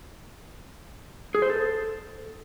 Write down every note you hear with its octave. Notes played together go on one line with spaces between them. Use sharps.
G#4
C5
A4